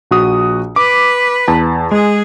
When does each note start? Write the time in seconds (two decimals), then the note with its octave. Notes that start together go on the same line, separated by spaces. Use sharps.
0.11 A#1 F#4 D#6
0.76 B4 D6
1.48 E2 A5
1.91 G#3 G#4